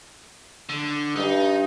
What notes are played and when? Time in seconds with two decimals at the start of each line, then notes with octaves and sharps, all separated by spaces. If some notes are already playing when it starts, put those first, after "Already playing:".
0.69 D3
1.16 G2 D#4